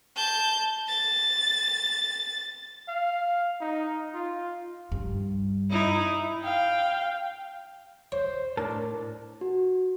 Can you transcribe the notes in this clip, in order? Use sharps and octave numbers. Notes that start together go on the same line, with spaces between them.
A5 G6
A6
F5
D#4
F4
G2
D#4 E4
F5 G5
C5 C#5
A2 D4 A#4 A5
F#4